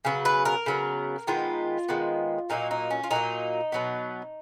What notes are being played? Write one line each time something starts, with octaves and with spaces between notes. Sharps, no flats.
C#3 F#3 B3
B4
A#4
C#3 F#3 B3
D#3 G#3 B3 F4
D#3 G#3 B3
A#2 F#3 A#3 D#4
D#4
C#4
F4
A#2 F#3 A#3 D#4
B2 F#3 B3